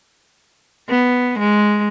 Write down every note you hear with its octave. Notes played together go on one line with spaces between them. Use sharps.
B3
G#3